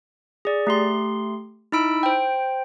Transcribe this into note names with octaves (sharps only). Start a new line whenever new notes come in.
G#4 D5
A3 G4 C6
D#4 E4 B5 E6 D7
C5 G5